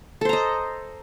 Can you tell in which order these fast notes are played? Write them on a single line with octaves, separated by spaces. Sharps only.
A4 C5 A#5 D#5